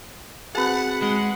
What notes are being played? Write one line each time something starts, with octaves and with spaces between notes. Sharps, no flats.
C4 F#4 G#4 B4 F#5 A5
G#3 F#5